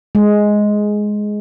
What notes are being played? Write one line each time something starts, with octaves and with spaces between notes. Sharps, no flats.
G#3